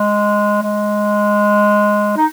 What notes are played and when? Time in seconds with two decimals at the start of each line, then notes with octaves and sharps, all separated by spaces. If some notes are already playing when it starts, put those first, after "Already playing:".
Already playing: G#3
0.62 G#3
2.17 D#4